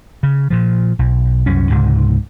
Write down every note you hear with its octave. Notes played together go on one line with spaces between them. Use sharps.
C#3
A#2 F3
B1
C2 F#2 C#4
C#2 G#2 C3